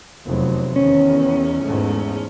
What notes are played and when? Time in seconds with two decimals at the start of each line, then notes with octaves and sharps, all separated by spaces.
0.24 F1 E2 F#3
0.76 E2 D#3 C#4
1.62 E2 G#2 A3